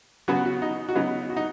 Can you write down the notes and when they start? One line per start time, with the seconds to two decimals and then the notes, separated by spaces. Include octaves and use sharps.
0.28 C#3 F#3 B3 F#4
0.45 F#4
0.62 D#4
0.89 F#4
0.95 C#3 F#3 B3 D#4
1.30 F#4
1.37 D#4